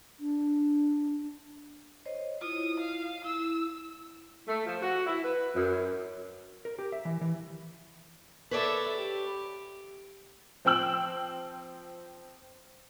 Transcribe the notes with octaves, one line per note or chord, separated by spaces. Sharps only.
D4
C5 C#5 D#5
E4 F4 D#6
F5
E4 E6
A3
F3
F#4
E4
B4
F#2
A#4
G4
E5
E3
E3
A4 B4 C#5 D5 E5
G4
F3 C4 G5 E6 F#7